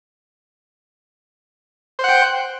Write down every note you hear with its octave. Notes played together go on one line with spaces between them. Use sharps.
C5 F#5 G5